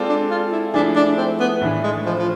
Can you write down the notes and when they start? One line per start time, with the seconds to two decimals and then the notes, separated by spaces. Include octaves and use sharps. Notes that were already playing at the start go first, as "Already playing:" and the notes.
Already playing: G#3 C4 F4 A4 D5
0.09 D4
0.30 F4
0.52 E4
0.74 F3 A3 D4 E4 G#4
0.96 D4
1.17 C4
1.40 B3
1.61 A2 E3 A3 D4 G#4
1.83 G#3
2.06 F3
2.19 F3